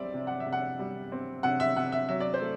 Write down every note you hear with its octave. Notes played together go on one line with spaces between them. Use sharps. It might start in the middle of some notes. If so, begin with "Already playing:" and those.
Already playing: G3 C4 D5 E5
C3
F#5
E5
C3
F#5
G3
C4
C3 F#5
E5
C3 F#5
E5
F#3 E5
D5
C5
A3